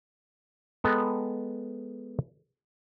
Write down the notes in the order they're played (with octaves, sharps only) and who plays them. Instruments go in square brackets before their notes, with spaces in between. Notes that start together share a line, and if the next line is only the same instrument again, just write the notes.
[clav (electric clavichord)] G#3 B3 A4 D#5 G5 A#5